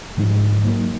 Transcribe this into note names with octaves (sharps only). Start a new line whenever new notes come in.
G#2 F3 G#3 D#4
F#3 A#3 D#4